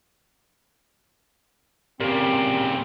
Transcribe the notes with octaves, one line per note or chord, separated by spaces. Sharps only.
A#2 C#3 C4 G4 A#4